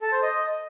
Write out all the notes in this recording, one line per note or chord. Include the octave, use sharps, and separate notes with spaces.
A4
C5
D#5